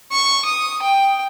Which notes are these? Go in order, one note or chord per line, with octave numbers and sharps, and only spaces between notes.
C#6
D#6
G5